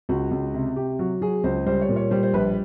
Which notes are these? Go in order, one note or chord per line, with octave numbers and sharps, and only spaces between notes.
C#2 F#4
C#2
C3
C3 G4
F#3 F#4
F#3 G#4
C#2 C5
G3 C5
C#5
A#2
C#5
G3 C5
C5
A#1 B4